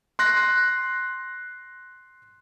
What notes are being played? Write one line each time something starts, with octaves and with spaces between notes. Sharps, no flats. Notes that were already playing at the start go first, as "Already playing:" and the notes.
C6 F#6 A#6